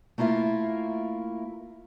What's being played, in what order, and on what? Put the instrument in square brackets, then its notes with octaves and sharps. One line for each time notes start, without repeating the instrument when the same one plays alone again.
[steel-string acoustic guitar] A3 A#3 E4 F4 A#4